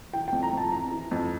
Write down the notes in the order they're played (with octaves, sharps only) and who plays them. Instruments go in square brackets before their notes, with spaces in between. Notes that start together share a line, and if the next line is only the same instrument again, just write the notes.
[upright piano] E3 G5
G5
F2
A#5
F2 A5
E3 A#5
E3
F2